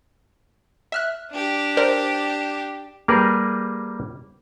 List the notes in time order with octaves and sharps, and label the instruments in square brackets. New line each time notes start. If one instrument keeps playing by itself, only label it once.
[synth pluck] E5 F6 F#6
[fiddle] D4 G4
[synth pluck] A#4 C5 D5
[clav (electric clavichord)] G3 A#3 G4 G#4 A#4 B4